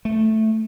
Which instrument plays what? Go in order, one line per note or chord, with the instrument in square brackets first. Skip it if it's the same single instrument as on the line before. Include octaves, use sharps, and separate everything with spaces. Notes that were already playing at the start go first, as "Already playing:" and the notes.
[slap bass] A3